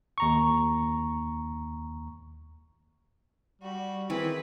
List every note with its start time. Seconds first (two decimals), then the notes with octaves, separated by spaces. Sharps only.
0.18 D#2 A#5 C#6
3.62 G3 F#4
4.10 D#3 E3 C4 G#4 B4